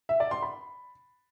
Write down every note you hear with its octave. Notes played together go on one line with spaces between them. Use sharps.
E5
D5
C6
B5